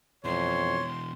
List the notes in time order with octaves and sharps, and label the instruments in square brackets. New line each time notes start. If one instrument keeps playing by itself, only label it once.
[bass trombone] F2 [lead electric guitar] B2 E3 [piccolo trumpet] C#5 [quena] C6